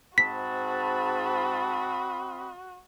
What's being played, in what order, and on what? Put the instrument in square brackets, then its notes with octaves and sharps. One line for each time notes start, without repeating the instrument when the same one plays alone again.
[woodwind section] G#2 A5 [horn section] C4 D#5 B5 [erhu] F#4 [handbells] B6